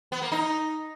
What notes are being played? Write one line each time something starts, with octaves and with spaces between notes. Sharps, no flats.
B3
A#3
D#4